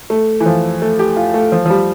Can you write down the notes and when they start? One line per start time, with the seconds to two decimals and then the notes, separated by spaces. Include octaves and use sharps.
0.10 A3
0.40 E3
0.46 F3
0.82 A3
0.99 G4
1.17 F4
1.34 A3
1.52 F3
1.66 F3
1.70 G3